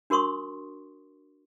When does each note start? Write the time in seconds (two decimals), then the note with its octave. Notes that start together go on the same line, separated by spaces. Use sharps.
0.10 D4 F#4 A#4 C6 C#6 D#6